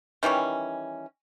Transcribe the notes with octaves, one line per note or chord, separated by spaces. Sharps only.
D#3 E3 G3 C#4